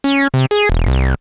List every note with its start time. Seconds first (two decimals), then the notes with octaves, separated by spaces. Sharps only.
0.04 C#4
0.34 C3
0.51 G#4
0.69 E1
0.88 C2